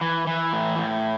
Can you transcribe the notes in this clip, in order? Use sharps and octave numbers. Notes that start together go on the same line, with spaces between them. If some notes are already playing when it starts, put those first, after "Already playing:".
E3
E3
A2
A2